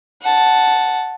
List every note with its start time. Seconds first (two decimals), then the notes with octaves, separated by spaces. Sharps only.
0.22 F#5 A5